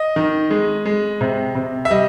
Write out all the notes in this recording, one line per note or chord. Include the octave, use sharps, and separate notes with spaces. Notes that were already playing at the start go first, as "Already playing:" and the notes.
Already playing: D#5
D#3
G#3
G#3
C3
C3
E5
G3 D#5